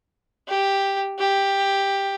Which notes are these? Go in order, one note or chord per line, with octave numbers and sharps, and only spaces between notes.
G4
G4